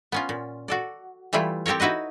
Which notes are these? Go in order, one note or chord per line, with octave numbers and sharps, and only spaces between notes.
B3 C#4 F4
A#2
F#4 A4 D5
E3 G3 A3 E4 F4
C4 G4 A4 A#4 C#5
D#4 E4 F#4 B4 D#5